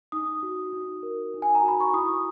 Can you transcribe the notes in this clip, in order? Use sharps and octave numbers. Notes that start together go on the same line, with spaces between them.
D#4 D#6
F#4
D#4
A#4
D#4
G#5
A#5
F#4 B5
C#6
E4 D#6